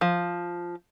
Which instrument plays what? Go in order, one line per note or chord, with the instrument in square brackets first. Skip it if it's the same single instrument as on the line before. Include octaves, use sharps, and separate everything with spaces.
[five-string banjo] F3